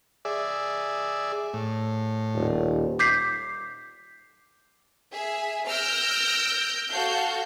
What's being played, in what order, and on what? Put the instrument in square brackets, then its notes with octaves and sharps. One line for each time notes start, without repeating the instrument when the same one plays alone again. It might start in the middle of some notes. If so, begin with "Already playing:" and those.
[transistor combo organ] G#4 D5 E5
A2
[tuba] D#1
[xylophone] D6 G6 B6 C7
[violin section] G#4 E5 G#5
E6 F6 G6 A#6 D7
F#4 A4 F5 G6